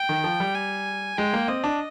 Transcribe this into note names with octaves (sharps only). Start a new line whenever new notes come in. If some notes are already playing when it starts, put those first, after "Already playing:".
Already playing: G5
D#3
F3
G3
G#5
G#3 G5
A#3
C4 D#5
D4